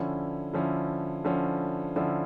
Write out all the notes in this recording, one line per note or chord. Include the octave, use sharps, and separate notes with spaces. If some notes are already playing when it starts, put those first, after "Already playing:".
Already playing: D3 F3 C#4 E4
D3 F3 C#4 E4
D3 F3 C#4 E4
D3 F3 C#4 E4